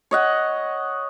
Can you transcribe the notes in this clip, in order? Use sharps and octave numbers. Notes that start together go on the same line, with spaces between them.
C#5 D#5 F#5